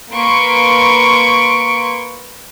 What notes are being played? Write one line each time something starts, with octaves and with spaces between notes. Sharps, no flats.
A#3 B4 C6 C#6 D7